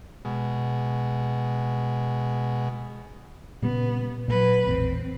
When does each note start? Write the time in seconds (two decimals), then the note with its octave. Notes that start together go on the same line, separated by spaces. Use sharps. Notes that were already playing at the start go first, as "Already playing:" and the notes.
0.25 B2 G#3
3.62 A#2 C#3 G3 B3
4.28 A#2 F#3 B4
4.67 A1 E2 C4